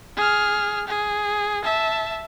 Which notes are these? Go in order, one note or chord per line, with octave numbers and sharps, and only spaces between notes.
G#4 F6
G#4
E5 A5